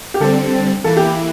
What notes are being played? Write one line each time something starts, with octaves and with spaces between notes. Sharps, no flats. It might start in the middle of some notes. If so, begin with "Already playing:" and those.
G4
D3 G3 C4 A4
E3 A#3 E4 A4
G4